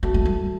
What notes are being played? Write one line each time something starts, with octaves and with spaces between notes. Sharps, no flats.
B3 F#4 A4 E5 A5
A3
G3